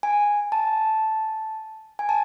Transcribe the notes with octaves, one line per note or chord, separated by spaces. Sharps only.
G#5
A5
G#5
A5